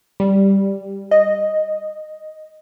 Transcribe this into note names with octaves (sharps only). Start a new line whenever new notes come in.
G3
D#5